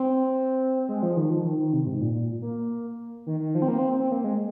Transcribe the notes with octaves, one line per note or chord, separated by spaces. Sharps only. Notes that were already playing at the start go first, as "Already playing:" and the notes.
Already playing: C4
G#3
F3
D#3
F3
D#3
D#3
C3
G#2
A#2
A#2
A#3
D#3
D#3
F3
C4
A#3
C4
C4
A#3
G#3